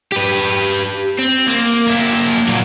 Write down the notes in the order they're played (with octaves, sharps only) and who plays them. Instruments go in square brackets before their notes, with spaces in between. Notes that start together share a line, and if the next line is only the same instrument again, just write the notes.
[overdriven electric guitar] G4 B4
C4
A#3
A#3 E4
A#2 F#3